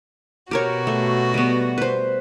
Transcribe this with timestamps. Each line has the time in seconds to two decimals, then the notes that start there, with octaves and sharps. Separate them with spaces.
0.51 B2 F#4 G4 A#4 C#5
0.87 A3
1.34 G3 B3
1.78 B4 C5